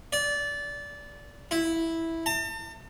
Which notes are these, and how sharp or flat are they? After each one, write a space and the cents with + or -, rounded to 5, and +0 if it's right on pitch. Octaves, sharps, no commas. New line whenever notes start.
D5 -20
E4 -5
A5 +40